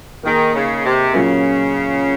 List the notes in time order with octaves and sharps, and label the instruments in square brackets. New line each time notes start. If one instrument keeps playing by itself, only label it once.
[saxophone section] D#3 [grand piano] A#3 D#4 G#4
[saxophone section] C#3
C3
[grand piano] A#2 F#3 C#4 F4 A#4 [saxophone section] C#3